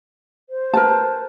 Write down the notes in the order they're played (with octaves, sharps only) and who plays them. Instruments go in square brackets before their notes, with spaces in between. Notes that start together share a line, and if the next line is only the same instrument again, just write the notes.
[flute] C5
[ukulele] A#4 B4 A5